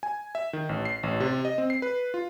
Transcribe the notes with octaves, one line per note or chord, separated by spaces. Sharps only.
G#5
E5
D#3
A1
C7
A1
C3
D#5
C4
C7
B4
F4